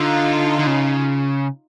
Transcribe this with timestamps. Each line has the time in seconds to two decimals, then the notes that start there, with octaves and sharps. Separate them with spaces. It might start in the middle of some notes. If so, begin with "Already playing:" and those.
Already playing: D3 D#4 F4
0.59 D3
0.67 C#3